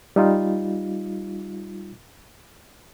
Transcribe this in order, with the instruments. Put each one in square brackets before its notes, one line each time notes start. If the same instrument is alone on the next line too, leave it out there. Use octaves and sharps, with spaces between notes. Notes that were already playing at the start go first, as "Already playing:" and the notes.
[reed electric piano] G3 D#4 F4